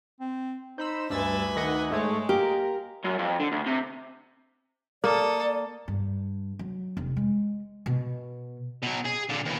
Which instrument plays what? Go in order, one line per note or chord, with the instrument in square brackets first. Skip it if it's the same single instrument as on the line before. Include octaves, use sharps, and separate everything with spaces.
[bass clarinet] C4
[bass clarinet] D#4 [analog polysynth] C5 B5 E6
[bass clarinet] D2 [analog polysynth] G2 E6 A6 [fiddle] B4 G#5
[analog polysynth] D#3 D#5 F#5
[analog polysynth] G#2 A3 C#5 [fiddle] G#3
[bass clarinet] A#3 [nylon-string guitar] G4 [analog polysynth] A#4
[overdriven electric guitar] F#2
F2
D3
D2
C3
[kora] A#3 [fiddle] A4 D#6 [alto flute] D5
[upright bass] G2
F#3
F1
G#3
B2
[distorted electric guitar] B2 F#3
G#4
A#2 D3
D#2 E3